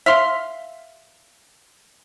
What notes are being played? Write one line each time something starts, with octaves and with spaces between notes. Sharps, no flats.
E5 F5 C6